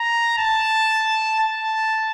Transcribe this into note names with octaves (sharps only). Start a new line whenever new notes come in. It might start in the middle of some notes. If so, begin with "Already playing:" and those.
Already playing: A#5
A5
A5